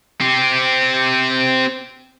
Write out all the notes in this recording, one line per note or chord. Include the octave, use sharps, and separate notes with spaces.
C4 G4